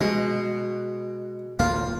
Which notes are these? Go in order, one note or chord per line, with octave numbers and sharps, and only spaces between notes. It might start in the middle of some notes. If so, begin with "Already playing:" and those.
B2 G#3
D1 E2 A#3 F4